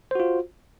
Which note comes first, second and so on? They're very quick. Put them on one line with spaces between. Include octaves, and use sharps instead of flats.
C5 F#4 F4